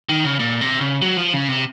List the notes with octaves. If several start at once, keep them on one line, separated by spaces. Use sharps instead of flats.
D#3
C#3
A#2
C3
C#3
F#3
F3
C#3
C3